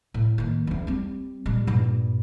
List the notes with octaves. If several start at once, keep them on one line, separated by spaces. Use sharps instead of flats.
A2
D#3 A#3
E2 D4
G3 C4
A#2 G3
G2 A#2